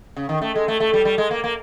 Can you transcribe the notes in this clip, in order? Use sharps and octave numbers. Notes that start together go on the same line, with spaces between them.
C#3
D#3
A3
G#3
A3
A3
G3
G3
G#3
A#3
A#3